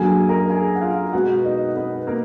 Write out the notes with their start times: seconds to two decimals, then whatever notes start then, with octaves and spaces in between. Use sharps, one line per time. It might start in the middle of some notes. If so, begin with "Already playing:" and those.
Already playing: F#2 D3 F#3 A#3 G#4 G#5
0.29 A#4 A#5
0.50 G#4 G#5
0.76 F#5
0.81 F4 F5
1.13 B2 G#3 B3 F#4 F#5
1.44 D#4 D#5
1.76 B3 B4
2.07 A#3 A#4